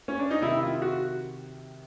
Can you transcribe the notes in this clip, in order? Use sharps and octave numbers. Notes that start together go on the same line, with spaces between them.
C#4
D4
D#4
C3 D#3 E4
F4
F#4